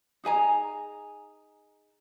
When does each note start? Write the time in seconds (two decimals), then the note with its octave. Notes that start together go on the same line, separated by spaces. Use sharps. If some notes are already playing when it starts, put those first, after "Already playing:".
0.24 D#4 G#4 G#5 A#5